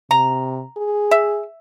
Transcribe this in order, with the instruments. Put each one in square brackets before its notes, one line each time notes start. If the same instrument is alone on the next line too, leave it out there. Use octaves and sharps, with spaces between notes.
[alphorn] C3 [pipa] A#5
[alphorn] G#4
[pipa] E5